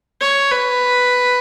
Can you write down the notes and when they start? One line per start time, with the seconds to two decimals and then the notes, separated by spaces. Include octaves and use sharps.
0.21 C#5
0.51 B4